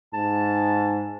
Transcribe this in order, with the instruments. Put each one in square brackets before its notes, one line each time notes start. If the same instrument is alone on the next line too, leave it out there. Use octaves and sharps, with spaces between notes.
[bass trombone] G#2 [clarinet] A5